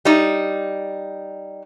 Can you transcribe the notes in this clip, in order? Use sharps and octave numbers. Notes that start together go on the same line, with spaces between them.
G3 D#4